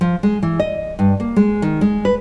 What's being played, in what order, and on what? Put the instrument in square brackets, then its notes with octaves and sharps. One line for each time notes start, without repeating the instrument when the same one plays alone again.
[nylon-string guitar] F3
G#3
E3
D#5
G2
A#3
G#3
D#3
G#3
B4